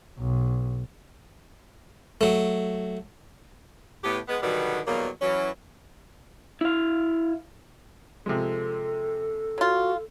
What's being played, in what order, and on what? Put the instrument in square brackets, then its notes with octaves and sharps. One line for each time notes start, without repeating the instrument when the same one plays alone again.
[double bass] B1
[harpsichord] F#3 A3
[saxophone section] A2 B3 G4
G#3 B3
B2 D3 D#3 F#3 G3 B3
E2 B2 F#3 G3 A#3
E3 F#3 C#4
[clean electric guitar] E4 F5
[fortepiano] C3 F3 G#3 [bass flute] A4
[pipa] F#3 F4 [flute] F#4